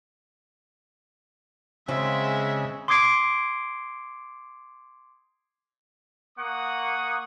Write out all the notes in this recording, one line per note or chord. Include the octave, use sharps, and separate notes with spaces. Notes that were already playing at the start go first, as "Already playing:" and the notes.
C#3 G#3 C4 F4 E5
C6 D6 D#6 G#6 C7 D7
A#3 F#5 C#6 D#6